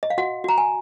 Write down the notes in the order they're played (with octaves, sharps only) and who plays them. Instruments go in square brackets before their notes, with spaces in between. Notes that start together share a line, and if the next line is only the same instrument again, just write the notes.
[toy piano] D#5
F5
F#4 F#5
F#4 A#5
G#5